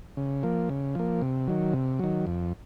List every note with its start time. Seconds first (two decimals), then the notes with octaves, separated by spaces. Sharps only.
0.17 C#3
0.43 F3 A#3
0.69 C#3
0.95 F3 A#3
1.22 C3
1.48 D#3 F#3
1.74 C3
1.99 D#3 F#3
2.27 F2